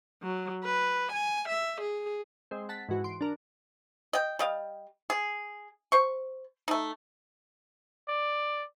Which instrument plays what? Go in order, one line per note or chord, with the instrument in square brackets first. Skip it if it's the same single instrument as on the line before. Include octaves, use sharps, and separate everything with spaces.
[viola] F#3
B4
G#5
E5
G#4
[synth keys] G#3 C4
F#5 A5 B6
G#2 E3 F#4
C6 D7
D4 A#4
[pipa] D#5 G5
G3 D#5 F5
G#4
C5 C#6
A3 D#4
[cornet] D5